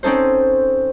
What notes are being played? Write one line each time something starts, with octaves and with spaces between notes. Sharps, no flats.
C4 C#4 D#4 A4 C5